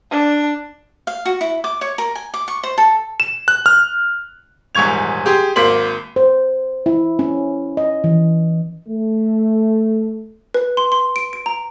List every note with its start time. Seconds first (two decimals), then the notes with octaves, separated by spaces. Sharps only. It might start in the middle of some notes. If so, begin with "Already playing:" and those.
0.11 D4
1.07 F5
1.25 F#4
1.41 E4
1.64 D6
1.81 C#5
1.98 A#4
2.15 G#5
2.34 D6
2.48 C#6
2.63 C5
2.78 A4
3.20 E7
3.48 F#6
3.66 F6
4.75 D#1 E2 G#2 C#6 G#6 F7
5.26 G4 G#4 C6
5.56 G#1 A#3 C6 B6 F#7
6.16 C5
6.86 E4
7.19 C#4
7.77 D#5
8.04 E3
8.87 A3
10.54 B4
10.77 C6
10.92 C6
11.16 D7
11.33 D7
11.46 A#5